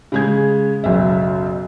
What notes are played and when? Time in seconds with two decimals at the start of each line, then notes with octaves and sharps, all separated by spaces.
0.12 C#3 G#3 G#6
0.84 F#1 B1 E5